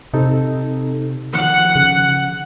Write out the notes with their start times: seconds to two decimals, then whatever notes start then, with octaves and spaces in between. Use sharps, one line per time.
0.14 C3 C4 D#4 A4
1.34 D#3 F3 F#5
1.76 C#3